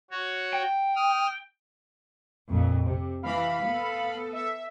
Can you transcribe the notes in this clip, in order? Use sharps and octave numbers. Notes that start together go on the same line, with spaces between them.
F#4 C#5
G5
D#6 F6
A#1 F2 A#2
C3
E3 F5 B5
B3 A4
E5